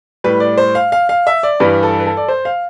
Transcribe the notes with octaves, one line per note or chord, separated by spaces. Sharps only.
A2 G3 B4
D5
C5
F5
F5
F5
E5
D5
G2 E3 G3 B4
A4
B4
A4
D5
C5
F5